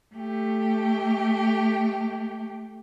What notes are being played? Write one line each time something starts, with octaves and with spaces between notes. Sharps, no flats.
A3 G4